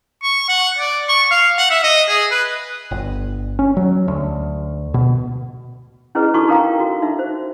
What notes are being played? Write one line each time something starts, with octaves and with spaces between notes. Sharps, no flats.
C#6
F#5
D5
C#6
F5
F#5
E5
D#5
G#4
B4
G1
C#4
F#3
D2
B2
C#4 E4 G#4 B4 D#5
D#4 E4 F#4 A4 C#6 D6
D#4 A4 A#4 F5 G5 A#5
F#4
D#4 E5
C5